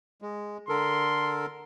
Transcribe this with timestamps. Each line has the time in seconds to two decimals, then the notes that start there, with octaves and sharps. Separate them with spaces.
0.22 G#3
0.69 D3 A4 A#4 C6